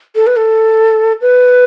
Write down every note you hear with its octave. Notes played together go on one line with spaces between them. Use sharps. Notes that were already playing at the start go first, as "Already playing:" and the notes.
A4
B4
A4
B4